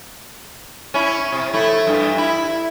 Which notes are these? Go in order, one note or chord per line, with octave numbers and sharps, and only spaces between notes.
C#4 E4
C3
A3 E4
G2
E4